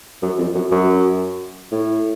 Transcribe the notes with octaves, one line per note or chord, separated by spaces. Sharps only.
F#2
F2
F#2
F#2
A2